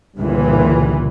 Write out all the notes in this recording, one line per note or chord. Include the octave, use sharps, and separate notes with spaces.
G1 C#2 A#2 E3